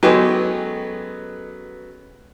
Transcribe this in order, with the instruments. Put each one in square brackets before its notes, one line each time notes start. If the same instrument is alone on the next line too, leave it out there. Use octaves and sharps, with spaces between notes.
[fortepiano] F#3 B3 [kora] G#3 C#4 G4 [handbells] A4 B4 D#5